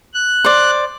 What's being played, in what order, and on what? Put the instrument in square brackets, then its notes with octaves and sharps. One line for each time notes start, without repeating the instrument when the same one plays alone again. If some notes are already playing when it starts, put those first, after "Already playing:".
[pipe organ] F#6
[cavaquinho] C5 D5